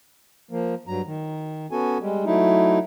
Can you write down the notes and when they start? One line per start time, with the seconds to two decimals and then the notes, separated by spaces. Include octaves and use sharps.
0.51 F3 A#3
0.88 G2 F#3 A#5
1.06 D#3
1.71 B3 C#4 F#4 A4 G#5
2.01 G3 G#3
2.25 F#3 A3 D#4 E4